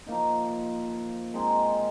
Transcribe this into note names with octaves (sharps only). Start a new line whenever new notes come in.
F3 A#3 D#4
G#3 C4 D#4 A#4